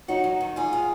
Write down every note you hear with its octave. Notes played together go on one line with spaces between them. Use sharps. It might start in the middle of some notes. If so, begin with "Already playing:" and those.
F#3 D#4 F#4
F#3
D#3
G#2 F4 G#4
D#3